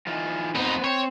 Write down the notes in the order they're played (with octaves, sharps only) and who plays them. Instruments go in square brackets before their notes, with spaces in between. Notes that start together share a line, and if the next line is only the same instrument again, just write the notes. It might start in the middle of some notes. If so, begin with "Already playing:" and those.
[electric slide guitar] E3 D#4 F4
[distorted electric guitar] F2 D#4 [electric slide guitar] B3 C4 B4
[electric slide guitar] C4 [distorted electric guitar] C#5